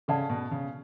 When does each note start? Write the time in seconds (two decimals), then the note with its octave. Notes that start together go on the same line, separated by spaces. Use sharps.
0.08 C#3 A4 D5 F#5 A5
0.30 B2
0.51 C#3